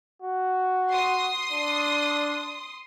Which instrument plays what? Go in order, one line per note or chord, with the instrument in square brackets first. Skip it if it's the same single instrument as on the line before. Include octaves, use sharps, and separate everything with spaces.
[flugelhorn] F#4
[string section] C6 D#6
[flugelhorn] D4